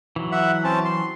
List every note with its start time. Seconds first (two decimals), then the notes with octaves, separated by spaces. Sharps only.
0.16 E3 F#3
0.32 E5 F#5
0.64 C4 C#4 A5
0.85 C6